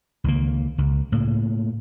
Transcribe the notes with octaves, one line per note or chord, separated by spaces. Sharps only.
C#2 D#3 A#3
C#2
A2 C#3 A#3